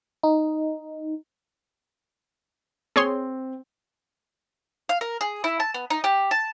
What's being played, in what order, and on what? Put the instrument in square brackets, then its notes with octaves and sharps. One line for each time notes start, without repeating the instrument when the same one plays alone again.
[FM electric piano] D#4
[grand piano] C4 [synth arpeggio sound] G#4 C#5 C6
[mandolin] F5
A#4
G#4
E4
A5
B3
D#4
G4
A5